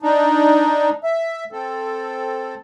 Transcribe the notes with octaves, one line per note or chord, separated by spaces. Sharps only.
D4 D#4
E5
C4 A4